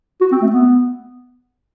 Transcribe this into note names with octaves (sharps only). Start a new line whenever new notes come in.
F#4
C4
A3
B3